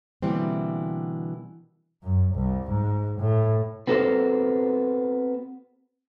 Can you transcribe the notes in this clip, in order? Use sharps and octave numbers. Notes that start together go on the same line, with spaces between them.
B2 D3 E3 G3 A#3 C4
F#2
C2
G#2
A2
B3 C4 F#4 A4 A#4 C5